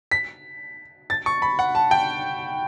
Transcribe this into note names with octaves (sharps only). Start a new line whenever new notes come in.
B6
A6
C#6
B5
F#5
A5
G5